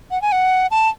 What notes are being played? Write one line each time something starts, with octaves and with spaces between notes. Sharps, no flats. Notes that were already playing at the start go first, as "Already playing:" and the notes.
F#5
G#5
F#5
A5